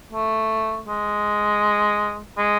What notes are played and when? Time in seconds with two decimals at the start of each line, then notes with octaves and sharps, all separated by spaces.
0.12 A3
0.87 G#3
2.37 G#3